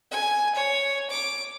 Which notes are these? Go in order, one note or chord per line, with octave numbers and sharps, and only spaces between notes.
G#5
C#5
D6